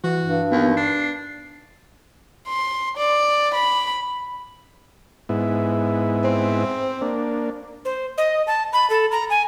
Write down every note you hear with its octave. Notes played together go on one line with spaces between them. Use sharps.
E3 F#4
G2
D#2 B3
D4 C7
C6
D5
B5
G#2 B3 E4
C4
A#3 D4
C5
D#5
A5
B5
A4
A#5
G#5